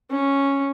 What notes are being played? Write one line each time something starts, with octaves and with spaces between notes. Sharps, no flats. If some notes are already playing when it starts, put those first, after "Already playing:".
C#4